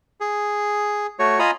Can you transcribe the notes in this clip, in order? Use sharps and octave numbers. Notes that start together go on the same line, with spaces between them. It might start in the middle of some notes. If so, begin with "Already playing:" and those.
G#4
A3 F#4 C#5
F4 D#5 G#5 A#5 B5